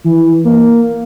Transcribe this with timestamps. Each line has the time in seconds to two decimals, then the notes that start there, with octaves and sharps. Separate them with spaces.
0.04 E3
0.45 A#3